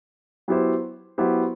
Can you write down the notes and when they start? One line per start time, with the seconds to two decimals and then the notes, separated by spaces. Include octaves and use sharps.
0.48 F#3 B3 E4 G4 C5
1.18 F#3 B3 E4 G4 C5